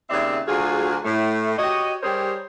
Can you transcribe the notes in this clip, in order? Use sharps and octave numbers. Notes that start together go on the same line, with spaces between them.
D#2 C#3 C4 D5 E5
D2 F#3 F4 F#4 G#4
A2 A3
F#4 G4 C#5 D#5
G3 G4 G#4 A#4 C5 C#5